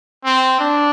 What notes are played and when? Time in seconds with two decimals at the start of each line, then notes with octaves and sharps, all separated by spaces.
0.25 C4
0.60 D4